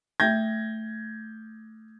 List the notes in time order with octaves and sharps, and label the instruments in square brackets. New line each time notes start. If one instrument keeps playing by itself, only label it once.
[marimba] A3 E5 G5 [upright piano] G6 G#6 A#6